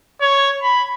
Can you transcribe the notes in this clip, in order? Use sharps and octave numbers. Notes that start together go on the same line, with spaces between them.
C#5
B5